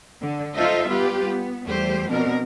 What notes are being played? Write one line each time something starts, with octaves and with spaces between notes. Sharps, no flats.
D3
D#4 F4 A4 C5 D#5 E5
G3 B3 F4 G4 B4
B3
E2 G3 A3 G4 C5
B2 F3 C4 D4 A#4